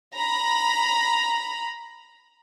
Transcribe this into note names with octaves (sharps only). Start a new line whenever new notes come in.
A#5 B5